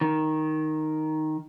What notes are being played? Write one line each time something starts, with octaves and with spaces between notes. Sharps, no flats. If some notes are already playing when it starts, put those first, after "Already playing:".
D#3